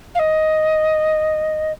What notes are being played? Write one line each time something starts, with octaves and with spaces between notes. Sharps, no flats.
F5
D#5